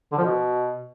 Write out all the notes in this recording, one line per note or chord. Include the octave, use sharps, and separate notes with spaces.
D3
F3
B2